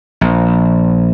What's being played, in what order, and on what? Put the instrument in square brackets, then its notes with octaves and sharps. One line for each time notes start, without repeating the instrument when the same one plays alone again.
[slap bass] A#1